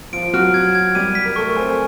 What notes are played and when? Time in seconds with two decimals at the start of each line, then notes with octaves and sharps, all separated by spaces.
0.13 F3 F4 D7
0.33 F#3 F#4 F6
0.54 G#6
0.75 G#6
0.95 G3 G4 D#7
1.15 B6
1.25 A#4
1.36 A3 A4 C#6
1.56 C4 C5 G#5